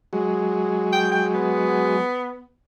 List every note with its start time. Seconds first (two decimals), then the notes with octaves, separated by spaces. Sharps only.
0.13 F#3 G#3
0.92 G5
1.11 G5
1.34 B3